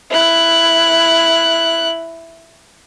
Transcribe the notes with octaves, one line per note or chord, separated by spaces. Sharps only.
E4 F#6